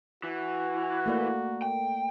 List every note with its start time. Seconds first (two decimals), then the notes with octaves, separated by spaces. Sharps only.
0.24 E3 F#4
1.06 A3 A#3 D5
1.62 G5